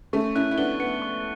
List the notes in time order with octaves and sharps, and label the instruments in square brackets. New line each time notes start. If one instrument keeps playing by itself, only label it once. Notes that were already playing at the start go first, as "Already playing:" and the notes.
[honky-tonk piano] A3 C#4 [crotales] C#6
[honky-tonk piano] C#4 E4 [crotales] F#6
[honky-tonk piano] E4
[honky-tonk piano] B3 D4 [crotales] G7
[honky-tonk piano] B3 [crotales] C#7
[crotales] C#6